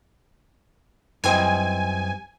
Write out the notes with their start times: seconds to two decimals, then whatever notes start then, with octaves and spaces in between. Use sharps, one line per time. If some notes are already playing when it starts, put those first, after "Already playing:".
1.24 F#2 E3 G3 C4 D#5 G#5